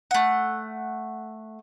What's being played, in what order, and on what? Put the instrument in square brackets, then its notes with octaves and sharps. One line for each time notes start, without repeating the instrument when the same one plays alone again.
[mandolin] A3 F#5